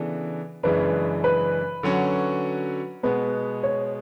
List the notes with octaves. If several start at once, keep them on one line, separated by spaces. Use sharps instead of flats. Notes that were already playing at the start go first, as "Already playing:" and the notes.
Already playing: C#3 E3 B3 D4 A4
F#2 C#3 E3 G#3 D4 B4
B4
D3 F#3 C#4 F#4
B2 G#3 B3 B4
C#5